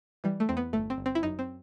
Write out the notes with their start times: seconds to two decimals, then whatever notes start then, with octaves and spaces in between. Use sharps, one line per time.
0.24 E3 G3
0.40 A3
0.49 E2 C4
0.57 B3
0.73 G1 A3
0.90 C4
0.98 G1
1.06 C4
1.15 E4
1.23 F#2 D#4
1.39 C4